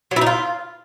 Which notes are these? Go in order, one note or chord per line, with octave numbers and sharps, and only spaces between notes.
F#3
E4
D#4
F4